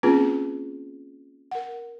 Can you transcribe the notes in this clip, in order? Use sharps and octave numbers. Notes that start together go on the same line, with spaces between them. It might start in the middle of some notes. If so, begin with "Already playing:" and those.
A#3 C4 C#4 F4 G#4 B4
A#4 F#5